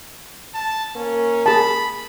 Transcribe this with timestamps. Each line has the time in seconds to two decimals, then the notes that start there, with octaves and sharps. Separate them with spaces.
0.55 A5
0.96 A#3 C#4
1.46 G#4 A5 B5